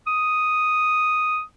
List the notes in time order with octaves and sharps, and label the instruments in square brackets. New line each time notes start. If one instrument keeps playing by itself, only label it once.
[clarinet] D#6